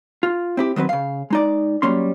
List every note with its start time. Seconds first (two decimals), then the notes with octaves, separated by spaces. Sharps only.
0.23 F4
0.57 C4 E4 G4
0.76 D#3 F#3 C4 B4
0.89 C#3 F5
1.30 G#3 D#4 D5
1.82 F#3 G3 A#3 C#4 C6